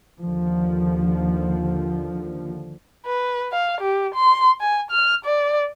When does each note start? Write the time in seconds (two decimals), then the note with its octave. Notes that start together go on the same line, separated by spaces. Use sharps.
0.21 D#2 D3 F3
3.06 B4
3.53 F5
3.81 G4
4.15 C6
4.61 G#5
4.91 F6
5.25 D5